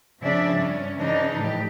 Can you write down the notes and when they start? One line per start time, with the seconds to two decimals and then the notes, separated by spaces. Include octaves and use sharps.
0.22 C#3 F3 C4 D4 D5 E5
0.57 G2 C#4
0.98 C#3 E3 F3 D4 D#4
1.39 A2 G4